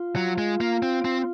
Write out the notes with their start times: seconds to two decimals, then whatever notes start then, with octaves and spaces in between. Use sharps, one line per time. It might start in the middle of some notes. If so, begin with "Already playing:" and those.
Already playing: F4
0.16 F#3
0.38 G#3
0.61 A#3
0.83 C4
1.05 C4